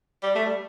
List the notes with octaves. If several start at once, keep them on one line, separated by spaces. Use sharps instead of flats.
G3
A3
G3